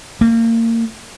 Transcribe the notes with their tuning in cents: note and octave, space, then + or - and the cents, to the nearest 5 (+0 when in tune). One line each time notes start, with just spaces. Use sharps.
A#3 -30